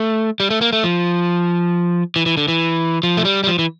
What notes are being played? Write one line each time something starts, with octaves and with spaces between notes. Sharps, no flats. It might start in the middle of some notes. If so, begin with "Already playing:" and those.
Already playing: A3
G3
A3
A#3
A3
F3
E3
E3
D3
E3
F3
A3
G3
G3
F3
E3